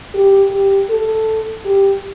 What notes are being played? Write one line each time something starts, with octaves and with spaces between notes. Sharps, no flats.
G4
G4
A4
G4